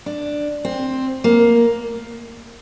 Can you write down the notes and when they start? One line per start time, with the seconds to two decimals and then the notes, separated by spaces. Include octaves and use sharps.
0.06 D4
0.65 C4
1.24 A#3